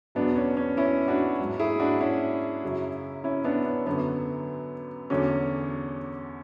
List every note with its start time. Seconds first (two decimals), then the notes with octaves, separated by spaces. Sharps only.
0.15 E2 B2 F#3 B3 D4
0.36 C#4
0.57 C#4
0.77 C#4 E4
1.08 D4 F#4
1.39 G#2 F#3
1.59 E4 G#4
1.80 D4 F#4
2.01 C#4 E4
2.63 F#2 C#3 F#3
3.24 C#4 E4
3.44 B3 D4
3.66 C#4
3.86 F#2 D3 F#3 B3
5.10 E2 D3 F#3 C#4